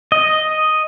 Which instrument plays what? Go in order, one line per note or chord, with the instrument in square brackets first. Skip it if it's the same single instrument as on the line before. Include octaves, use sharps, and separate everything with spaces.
[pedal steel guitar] D#5